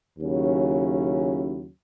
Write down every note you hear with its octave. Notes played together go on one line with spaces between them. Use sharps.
D#2 C#3 F#3 C#4 E4